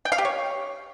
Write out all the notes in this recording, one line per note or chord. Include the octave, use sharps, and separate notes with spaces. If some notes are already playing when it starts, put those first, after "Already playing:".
G5
F5
G4
C#5